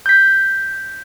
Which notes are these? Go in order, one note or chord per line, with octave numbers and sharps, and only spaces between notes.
G6 B6